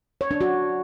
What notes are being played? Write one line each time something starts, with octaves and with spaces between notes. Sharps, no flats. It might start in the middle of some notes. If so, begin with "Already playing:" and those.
C#5
D4
F#4